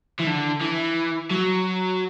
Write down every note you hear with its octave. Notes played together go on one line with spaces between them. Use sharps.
E3
D3
E3
F#3